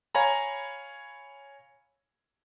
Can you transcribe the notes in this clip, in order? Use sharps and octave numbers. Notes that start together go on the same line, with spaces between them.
C#5 F5 G#5 A#5 B5